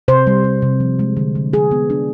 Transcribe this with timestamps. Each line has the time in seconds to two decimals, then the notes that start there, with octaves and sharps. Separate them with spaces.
0.08 C3 C5
0.27 G3
0.44 G3
0.62 C3
0.80 F3
0.99 G#3
1.17 D3
1.35 D3
1.53 F3 G#4
1.71 B3
1.90 D4